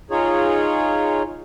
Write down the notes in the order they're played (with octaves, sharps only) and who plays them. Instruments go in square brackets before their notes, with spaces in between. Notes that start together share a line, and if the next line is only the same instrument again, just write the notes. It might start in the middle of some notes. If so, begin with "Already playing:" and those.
[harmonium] D#4 F4 G#4 C#5